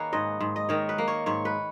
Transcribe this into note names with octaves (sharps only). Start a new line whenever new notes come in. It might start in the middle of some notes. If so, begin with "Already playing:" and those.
Already playing: D#3 A#3 G#4 B4 C#5
G#2 D#5
G#2
D#5
D#3 C#5
B4
A#3
C#5
G#2 C#5
B4